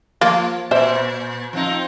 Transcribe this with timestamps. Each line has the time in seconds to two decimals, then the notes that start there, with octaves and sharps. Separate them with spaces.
0.21 F3 A#3 F4
0.71 A#2 C5 E5
1.53 F3 C4 D#4